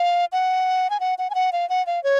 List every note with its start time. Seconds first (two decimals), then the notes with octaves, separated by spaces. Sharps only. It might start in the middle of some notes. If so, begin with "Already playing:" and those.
Already playing: F5
0.32 F#5
0.90 G#5
1.00 F#5
1.18 F#5
1.30 G#5
1.35 F#5
1.53 F5
1.69 F#5
1.87 F5
2.04 C#5